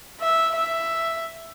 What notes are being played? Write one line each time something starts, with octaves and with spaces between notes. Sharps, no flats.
E5
E5